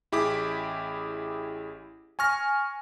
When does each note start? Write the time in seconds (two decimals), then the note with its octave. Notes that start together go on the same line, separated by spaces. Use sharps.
0.12 A1 E4 G4 G#4 D6 B6
2.19 G#5 C#6 F6 A#6